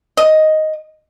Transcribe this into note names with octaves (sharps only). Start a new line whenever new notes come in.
D#5